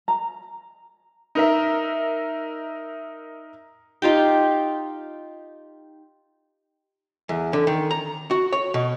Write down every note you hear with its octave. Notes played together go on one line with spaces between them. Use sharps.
A#5
D#4 A#4 E5
D#4 F4 G4 G5
E2
D3
D#3
A#5
F#4
C#5
B2